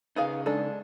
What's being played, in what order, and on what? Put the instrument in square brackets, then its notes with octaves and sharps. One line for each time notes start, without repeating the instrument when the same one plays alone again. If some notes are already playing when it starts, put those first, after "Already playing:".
[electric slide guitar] C#3 D#4 [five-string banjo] B3 G#4 F5
[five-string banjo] G#3 D4 A4